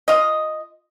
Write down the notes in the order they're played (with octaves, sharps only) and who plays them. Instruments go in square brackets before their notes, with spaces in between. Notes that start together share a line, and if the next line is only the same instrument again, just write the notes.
[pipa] F4 D#5